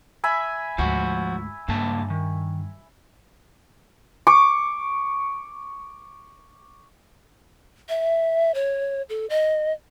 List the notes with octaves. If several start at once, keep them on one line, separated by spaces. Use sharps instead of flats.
E5 G#5 B5
D2 G#2 F3 F#4
C#2 G2 A#3 A5
D#3
C#6 D6
E5
C#5
A4
D#5